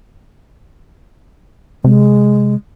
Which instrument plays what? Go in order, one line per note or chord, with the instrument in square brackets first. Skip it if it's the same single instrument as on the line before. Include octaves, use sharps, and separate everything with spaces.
[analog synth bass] C3 [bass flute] G#3